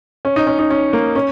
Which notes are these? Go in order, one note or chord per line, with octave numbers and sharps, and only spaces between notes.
C#4
D#4
C#4
D#4
C#4
A#3
C#4